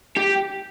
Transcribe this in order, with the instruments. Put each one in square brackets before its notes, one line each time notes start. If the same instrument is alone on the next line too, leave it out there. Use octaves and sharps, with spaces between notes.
[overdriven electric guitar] G4